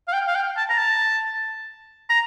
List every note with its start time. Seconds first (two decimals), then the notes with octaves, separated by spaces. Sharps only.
0.08 F5
0.13 G5
0.27 F5
0.35 G5
0.57 A5
0.70 A#5
0.78 A5
2.10 A#5